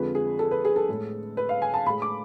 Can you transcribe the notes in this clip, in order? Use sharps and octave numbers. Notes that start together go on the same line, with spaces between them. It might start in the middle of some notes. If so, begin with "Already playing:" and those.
Already playing: F2 D3 F3 G#3 B4
G#4
A4
B4
G#4
A4
A2 G#3
B4
F5
G#5
A5
A2 G#3 B5
D6